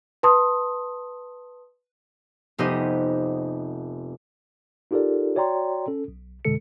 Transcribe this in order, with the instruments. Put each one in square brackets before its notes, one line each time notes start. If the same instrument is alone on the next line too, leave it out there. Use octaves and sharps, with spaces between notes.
[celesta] B4 A5 C6 D#6
[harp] F1 B3 D#4 G4 C5 D#5
[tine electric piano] D#4 F4 G4 A4 A#4 D5
F#4 C#5 D5 G5 A#5 C6
C#4 A4
B1
F2 B2 D3 G#3 A4 C#7